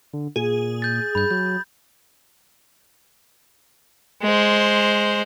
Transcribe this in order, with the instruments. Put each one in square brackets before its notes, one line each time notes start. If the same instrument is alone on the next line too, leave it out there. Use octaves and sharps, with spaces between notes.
[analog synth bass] D3
[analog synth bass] A#2 [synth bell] G#4
[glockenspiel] G6 A6
[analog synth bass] G2 [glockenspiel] B5 G6
[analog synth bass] F#3 [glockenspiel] G6
[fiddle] G#3 C5